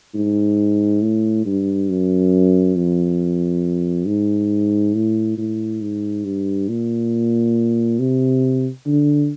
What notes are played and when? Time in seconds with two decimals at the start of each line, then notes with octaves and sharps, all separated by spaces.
0.15 G#2
1.02 A2
1.46 G2
1.90 F#2
2.76 F2
4.07 G#2
4.95 A2
5.38 A2
5.82 G#2
6.25 G2
6.69 A#2
8.00 C3
8.86 D3